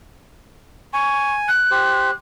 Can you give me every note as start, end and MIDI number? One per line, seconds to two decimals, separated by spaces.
0.93 1.49 80
0.93 1.35 85
1.48 2.14 90
1.71 2.11 67
1.71 2.11 72